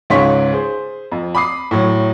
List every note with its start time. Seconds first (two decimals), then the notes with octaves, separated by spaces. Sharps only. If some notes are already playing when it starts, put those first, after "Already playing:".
0.10 C#2 G#2 C#4 C6 C#6 B6
0.53 G#4 C5
1.12 F2
1.35 B5 D6 D#6 C7
1.71 A2 F#3